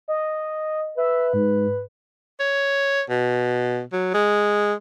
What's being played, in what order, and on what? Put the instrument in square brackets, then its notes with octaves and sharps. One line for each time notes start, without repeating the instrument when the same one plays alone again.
[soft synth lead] D#5
[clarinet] B4 [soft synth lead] E5
[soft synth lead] G#2
[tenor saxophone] C#5
B2
F#3
G#3